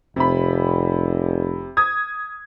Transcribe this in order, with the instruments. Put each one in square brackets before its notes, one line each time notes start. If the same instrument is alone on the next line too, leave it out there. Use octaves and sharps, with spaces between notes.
[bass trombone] F1 [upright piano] C3 B5
[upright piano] D#6 G#6